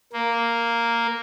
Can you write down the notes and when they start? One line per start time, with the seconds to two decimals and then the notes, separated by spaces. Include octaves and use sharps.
0.13 A#3